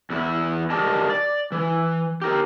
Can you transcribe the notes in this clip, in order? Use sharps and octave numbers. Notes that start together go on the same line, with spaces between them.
E2 E4
G4 A#4 D5 D#5 A5
D5
E3
G4 A#4